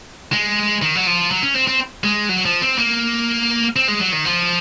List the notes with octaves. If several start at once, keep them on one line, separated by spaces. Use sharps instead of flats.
G#3
D#3
F#3
F3
F#3
C#4
C4
C4
G#3
F#3
F3
C4
A#3
C4
G#3
F#3
D#3
F3